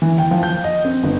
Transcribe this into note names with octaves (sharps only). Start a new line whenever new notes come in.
E3
G5
F3
G6
D#5
C4
G1